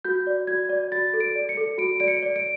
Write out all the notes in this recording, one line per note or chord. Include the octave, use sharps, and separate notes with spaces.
F#4 G6
D5
F#4 G#6
D5
F#4 A6
A4
D7
D5
C#7
A4
F#4 D7
D5 D7
C#7
D5
D7